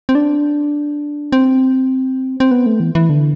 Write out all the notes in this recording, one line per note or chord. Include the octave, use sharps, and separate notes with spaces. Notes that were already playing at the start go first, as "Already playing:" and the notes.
C4
D4
C4
C4
B3
A3
E3
E3
D3